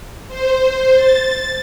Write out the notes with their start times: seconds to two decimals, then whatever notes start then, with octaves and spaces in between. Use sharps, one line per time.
0.28 C5
0.94 A6